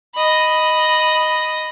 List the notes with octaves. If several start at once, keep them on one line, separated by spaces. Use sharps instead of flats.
D#5 B5